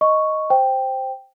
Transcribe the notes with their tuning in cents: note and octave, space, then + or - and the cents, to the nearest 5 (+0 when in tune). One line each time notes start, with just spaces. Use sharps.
D#5 +0 C#6 +0
C5 +0 G5 +0